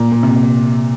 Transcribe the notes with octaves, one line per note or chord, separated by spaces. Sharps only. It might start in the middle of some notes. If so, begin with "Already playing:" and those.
Already playing: A#2
A#2
C3